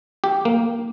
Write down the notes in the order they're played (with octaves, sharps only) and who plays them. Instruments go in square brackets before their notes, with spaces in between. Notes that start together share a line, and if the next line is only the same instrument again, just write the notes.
[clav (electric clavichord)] G4
A#3